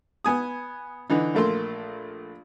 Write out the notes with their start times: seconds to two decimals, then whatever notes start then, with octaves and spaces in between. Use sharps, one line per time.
0.24 B3 G#5 D#6
1.10 D3 E3 D#4
1.35 A#1 A3 A#3 C6